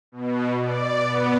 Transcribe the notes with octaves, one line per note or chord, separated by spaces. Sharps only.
B2
D5
B3